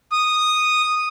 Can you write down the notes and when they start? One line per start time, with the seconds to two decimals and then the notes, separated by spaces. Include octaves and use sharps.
0.12 D#6